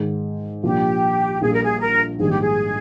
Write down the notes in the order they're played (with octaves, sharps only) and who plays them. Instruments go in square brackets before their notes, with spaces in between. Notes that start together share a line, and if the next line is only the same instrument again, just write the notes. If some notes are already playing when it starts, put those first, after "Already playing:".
Already playing: [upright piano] G#2 D#3 G#3
[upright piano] C2 A#2 F3 A#3 D4 [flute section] G4
[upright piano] A#1 A#2 G3 [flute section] G#4
[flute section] A#4
G#4
A#4
[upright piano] A#1 G#2 D#3 G3 A#3 [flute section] G#4
[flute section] G4
G#4